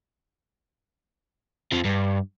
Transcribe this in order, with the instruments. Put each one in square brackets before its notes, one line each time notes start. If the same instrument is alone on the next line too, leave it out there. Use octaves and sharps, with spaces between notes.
[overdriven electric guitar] F2 F3
G2